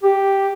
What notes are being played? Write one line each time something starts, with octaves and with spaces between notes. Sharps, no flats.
G4